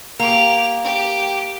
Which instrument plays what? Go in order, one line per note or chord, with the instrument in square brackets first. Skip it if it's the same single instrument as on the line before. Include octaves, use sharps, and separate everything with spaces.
[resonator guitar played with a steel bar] A#3 [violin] G4 F7
[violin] G4